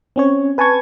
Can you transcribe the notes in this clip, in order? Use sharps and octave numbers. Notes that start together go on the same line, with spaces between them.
C4 C#4 C#5
B4 G#5 A5 C#6 G#6